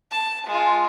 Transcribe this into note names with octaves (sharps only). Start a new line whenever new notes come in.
A5
G#3 F4